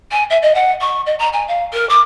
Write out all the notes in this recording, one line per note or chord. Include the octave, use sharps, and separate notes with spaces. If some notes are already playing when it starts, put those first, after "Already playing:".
G#5
E5
D#5
F#5
C#6
D#5
A#5
G#5
F5
A#4
D6